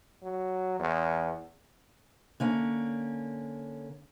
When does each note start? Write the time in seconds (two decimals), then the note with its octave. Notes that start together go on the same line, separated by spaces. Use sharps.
0.23 F#3
0.80 E2
2.40 D3 A#3 C#4